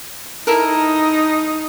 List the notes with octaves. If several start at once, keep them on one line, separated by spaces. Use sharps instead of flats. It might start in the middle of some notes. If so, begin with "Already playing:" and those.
D#4 E4 A4 A#4